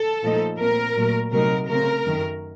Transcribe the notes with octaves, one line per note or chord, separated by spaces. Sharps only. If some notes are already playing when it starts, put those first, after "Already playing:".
Already playing: A4
A#2 F3 A3 D#4
A#2 A3 C4 A#4
A#2 F#3 A3
C3 F#3 A3 D#4 A#4
C#3 A3 C4 A#4
F#2 D#3 A3